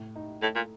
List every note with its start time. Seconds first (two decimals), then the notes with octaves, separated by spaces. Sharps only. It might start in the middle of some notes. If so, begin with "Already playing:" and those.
Already playing: A2
0.16 D#4
0.42 A2 A3
0.55 A#2